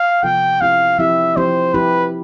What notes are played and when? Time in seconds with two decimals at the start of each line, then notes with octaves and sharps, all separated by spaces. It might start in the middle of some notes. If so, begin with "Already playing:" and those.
Already playing: F5
0.23 C3 F3 B3 F4 A4 G5
0.61 F3 C4 E4 G4 F5
0.99 F3 C4 E4 G4 E5
1.37 F3 C4 E4 G4 C5
1.74 F3 C4 E4 G4 B4